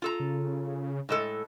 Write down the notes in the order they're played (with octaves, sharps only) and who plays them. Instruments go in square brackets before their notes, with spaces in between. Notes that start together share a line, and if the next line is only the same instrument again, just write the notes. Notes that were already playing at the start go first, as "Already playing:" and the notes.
[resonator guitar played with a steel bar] F4 A4 A#5
[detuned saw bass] C#3
[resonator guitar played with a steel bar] A2 G#3 A4